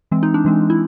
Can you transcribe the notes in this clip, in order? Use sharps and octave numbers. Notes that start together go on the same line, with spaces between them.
E3 G#3 C4
D#4
D4
E3 G#3 C4
E4